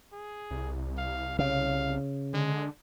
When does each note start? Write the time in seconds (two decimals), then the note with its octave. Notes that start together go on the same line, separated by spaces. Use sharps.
0.12 G#4
0.51 C2
0.97 F5
1.39 C#3 F5
2.34 D3 G#3